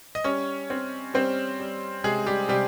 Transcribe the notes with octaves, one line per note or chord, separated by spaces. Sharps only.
D#5
G3 C#4 C#5
C4
G3 C4 C5
G3
C3 G#3 G#4
G3 G4
C3 G3 G4